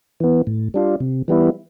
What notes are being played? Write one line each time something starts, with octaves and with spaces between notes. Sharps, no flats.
E3 B3
A2
G3 D4 F4
C3
E3 G3 B3 E4